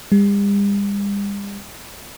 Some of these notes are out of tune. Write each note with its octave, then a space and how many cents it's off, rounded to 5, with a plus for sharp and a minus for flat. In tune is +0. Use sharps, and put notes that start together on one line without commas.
G3 +45